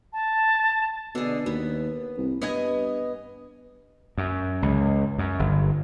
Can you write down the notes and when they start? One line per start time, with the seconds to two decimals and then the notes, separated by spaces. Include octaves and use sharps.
0.13 A5
1.15 B2 D3 G#4
1.46 D#2 B3
2.17 C2
2.42 G2 B3 D#5 G#5
4.18 F#2
4.62 C#2
5.18 F#2
5.39 G1